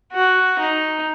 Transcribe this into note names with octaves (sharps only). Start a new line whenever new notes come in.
F#4
D#4